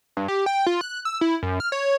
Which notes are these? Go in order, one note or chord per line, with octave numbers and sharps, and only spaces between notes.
G2
G4
G5
F4
F#6
E6
E4
F#2
F6
C#5